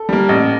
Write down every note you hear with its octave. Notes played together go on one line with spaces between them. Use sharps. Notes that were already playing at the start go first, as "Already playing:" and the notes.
Already playing: A4
G3 A#3
A1